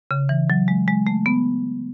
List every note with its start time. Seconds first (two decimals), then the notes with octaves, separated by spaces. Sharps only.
0.11 C#3
0.29 E3
0.50 F#3
0.68 G#3
0.88 G#3
1.07 A3
1.26 B3